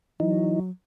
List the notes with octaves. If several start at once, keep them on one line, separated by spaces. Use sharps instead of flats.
E3 F#3 D#4